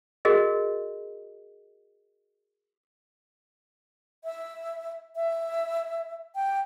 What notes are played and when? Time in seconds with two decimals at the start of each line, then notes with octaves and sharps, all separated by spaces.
0.25 F#4 G#4 A#4 D#5
4.24 E5
5.16 E5
6.35 G5